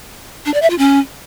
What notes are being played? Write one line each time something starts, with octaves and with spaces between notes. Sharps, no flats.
D4
D5
E5
F4
C#4